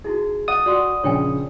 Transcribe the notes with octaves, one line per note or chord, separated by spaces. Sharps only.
D#4 E4 F#4 G#4
D#5 F#5 D#6 E6
F#4 D5 F#5 C6
A#1 C#3 C#5 G5 G#5